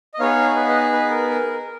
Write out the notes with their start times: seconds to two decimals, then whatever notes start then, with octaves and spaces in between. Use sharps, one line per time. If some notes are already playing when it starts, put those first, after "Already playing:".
0.14 D#5
0.19 B3 D#4 G#4 C#5 F5
0.56 B4
0.69 B4 D#5
0.93 B4
1.11 A#4
1.29 A#4